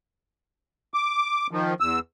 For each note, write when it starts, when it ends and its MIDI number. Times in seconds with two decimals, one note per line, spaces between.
0.94 1.47 86
1.51 1.74 51
1.51 1.74 53
1.80 1.99 40
1.80 1.99 88